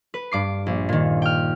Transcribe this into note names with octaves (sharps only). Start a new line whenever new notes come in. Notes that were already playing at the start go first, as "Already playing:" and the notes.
B4
G2 D6 C7
A#1
A#2 D#3
G5 F6